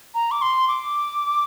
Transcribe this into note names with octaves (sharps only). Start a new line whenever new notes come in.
A#5
D6
C6
D6